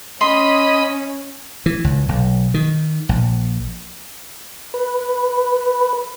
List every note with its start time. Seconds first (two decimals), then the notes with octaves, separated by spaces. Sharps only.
0.21 C#4 D#5 B5 C6
1.66 E3
1.84 C#2
2.09 B1
2.54 D#3
3.09 A#1
4.74 B4